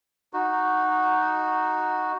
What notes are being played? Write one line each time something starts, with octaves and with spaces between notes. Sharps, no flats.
D#4 F#4